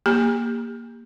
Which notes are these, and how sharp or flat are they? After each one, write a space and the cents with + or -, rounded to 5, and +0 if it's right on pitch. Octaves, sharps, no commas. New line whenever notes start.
A#3 +0 G4 +35